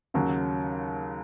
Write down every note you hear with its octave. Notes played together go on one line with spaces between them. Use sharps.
D#2 C#3 F#3